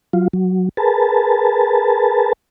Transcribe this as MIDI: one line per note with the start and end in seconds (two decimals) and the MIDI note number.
0.13 0.28 54
0.13 0.28 65
0.33 0.69 54
0.77 2.33 68
0.77 2.33 70
0.77 2.33 71
0.77 2.33 81